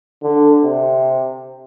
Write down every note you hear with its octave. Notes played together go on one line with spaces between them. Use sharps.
D3
C3